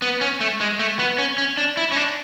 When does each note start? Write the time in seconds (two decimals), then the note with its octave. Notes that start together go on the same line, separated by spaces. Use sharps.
0.02 B3
0.21 C#4
0.41 A3
0.61 G#3
0.79 A3
0.99 B3
1.18 C#4
1.38 C#4
1.57 D4
1.77 E4
1.92 C#4
1.96 D4